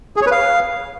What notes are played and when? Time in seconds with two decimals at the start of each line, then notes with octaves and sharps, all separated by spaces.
0.16 G#4
0.21 C#5
0.26 B4
0.31 F5